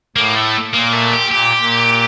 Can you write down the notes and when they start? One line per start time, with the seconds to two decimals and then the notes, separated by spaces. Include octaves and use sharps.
0.16 A2 A#3
0.35 A3
0.73 A#2 A#3
0.93 A3
1.13 G4
1.32 A#2 G4
1.60 A#2